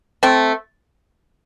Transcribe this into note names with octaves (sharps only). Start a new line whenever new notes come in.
A3 C4